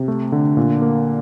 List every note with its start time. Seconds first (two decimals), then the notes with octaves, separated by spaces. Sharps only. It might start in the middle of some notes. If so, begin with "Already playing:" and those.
Already playing: C3
0.08 A3
0.32 D3
0.57 A#2
0.82 A#3